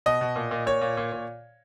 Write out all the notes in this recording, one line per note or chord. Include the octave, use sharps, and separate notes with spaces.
B2 D#5
B2
A#2
A#2
A#2 C#5
A#2
A#2
A#2